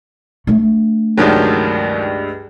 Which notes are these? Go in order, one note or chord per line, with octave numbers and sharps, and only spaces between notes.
A3 D4
C#2 G2 D#3 F3 F#3